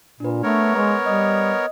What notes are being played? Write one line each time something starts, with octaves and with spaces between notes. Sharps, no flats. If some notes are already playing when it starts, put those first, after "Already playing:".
A#2 D4 B4
A3 B3 A#4 C#5
G#3 B4 A#5 C#6
G3 D#5 D#6